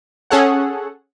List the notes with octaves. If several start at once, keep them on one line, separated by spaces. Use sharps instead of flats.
C#4 G#4 A4 C#5 F#5